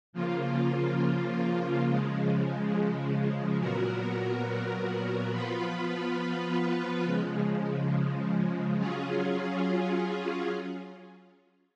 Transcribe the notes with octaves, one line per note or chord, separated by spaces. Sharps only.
C#3 F3 A#3 F4
C#3 F3 G#3
A#2 F#3 B3 F#4 A#4
F3 B3 F4 B4
C#3 F3 G#3
F#3 C#4 F4 G#4